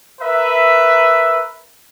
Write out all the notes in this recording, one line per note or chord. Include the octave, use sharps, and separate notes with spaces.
A#4 B4 E5